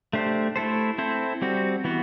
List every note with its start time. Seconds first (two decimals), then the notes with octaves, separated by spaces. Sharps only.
0.13 A3 D4 G4 C5
0.56 A3 E4 A4 C5
0.98 C4 E4 A4 C5
1.42 G3 C4 F#4
1.84 E3 B3 F#4